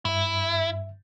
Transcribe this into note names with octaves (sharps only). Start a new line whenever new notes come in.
G2 E4 E5